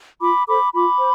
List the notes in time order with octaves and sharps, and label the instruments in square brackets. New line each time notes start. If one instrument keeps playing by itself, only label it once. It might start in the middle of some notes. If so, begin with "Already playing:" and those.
[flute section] F4 B5 D6
A4 C5 B5 D6
F4 B5 D6
C5